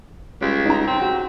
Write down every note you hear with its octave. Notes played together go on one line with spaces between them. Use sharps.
C#2 G3
D#4 A#5
C4 C6
F#4